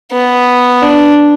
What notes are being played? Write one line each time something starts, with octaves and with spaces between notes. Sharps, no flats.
B3
D4